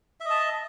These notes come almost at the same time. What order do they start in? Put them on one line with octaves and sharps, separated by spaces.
E5 D#5 A5